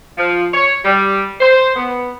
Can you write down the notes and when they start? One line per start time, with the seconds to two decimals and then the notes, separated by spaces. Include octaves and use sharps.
0.18 F3
0.54 C#5
0.84 G3
1.41 C5
1.76 B3